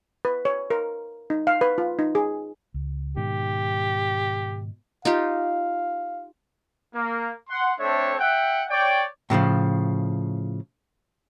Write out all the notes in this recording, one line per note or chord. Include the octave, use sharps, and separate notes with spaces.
B4
C#5
A#4
D#4
F5
B4
F4
D#4
G#4
C#2
G#2 B2 D#3 G4
D#4 F4 G4 F5
A#3
F#5 C6
A3 C4 D4 A4 C#5 E5
E5 F#5 G5
C#5 D5 G5
A2 C#3 E3 F3